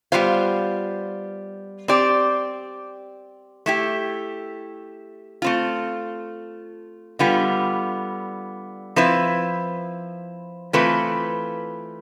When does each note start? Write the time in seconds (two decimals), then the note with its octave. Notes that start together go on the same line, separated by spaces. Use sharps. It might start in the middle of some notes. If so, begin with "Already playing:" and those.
0.12 G3 B3 F4 C5 F5
1.88 C4 G4 D5
3.66 A3 E4 G4
5.42 A3 C4 F4
7.19 D3 G3 B3 F4
8.96 F3 C4 E4 B4
10.73 E3 A3 C4 F4 B4